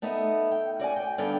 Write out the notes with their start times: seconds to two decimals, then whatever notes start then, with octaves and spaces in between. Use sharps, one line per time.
0.02 A3 B3 D#4 E5
0.51 G5
0.80 F#4 D5 E5 G#5
0.96 G5
1.18 G2 D3 B3 D4 G5